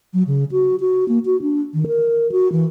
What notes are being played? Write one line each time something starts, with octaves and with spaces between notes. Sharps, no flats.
F#3
C#3
F#4
F#4
A#3
F#4
D4
D#3
A#4
F#4
E3